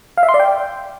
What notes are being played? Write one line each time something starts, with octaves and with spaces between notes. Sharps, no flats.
F5
E5
C6
D5
G5